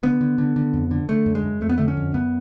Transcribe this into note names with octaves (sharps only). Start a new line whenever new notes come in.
D3 B3
D3
D3
D3
F2
D3
D3 A3
F#2
G#3
F#2
F2 A3
B3
D3 A3
C#4
F2
F#2 B3